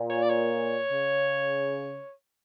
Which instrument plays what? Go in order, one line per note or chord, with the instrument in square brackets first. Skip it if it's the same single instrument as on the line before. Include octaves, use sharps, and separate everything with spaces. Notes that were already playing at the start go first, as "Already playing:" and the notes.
Already playing: [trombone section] A#2
[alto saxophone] C#5
D5
C#5
[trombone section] C#3